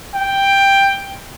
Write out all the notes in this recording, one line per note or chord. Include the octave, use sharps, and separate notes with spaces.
G5